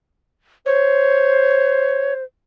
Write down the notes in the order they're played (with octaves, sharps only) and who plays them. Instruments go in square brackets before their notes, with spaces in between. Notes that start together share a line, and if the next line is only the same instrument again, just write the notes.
[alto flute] C5 [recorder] C#5